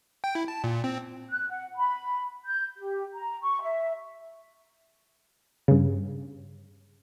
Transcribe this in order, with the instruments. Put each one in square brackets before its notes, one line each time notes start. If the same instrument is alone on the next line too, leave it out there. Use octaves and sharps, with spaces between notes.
[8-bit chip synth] G5
E4
A5
A#2
C4
[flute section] F#6
F#5
B5
G6
G4
A#5
C#6
E5
[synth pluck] G2 C#3